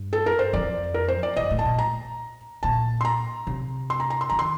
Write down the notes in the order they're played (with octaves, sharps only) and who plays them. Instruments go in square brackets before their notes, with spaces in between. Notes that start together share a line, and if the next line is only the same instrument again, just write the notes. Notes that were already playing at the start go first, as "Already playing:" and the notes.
Already playing: [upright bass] G2
[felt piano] A4
A#4
C5
[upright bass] F2 [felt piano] D5
[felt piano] A#4
C5
D5
[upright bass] G2 [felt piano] D#5
[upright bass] A2
[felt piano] A5
[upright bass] A#2
[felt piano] A#5
[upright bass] A#2 [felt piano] A5
[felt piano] C6
A#5
[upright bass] C3
[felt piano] C6
A#5
A#5
C6
[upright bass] D#3 [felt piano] A#5
[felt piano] C6